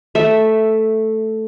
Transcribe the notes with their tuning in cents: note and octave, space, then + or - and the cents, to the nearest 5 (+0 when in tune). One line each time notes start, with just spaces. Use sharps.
A3 +0 E5 -5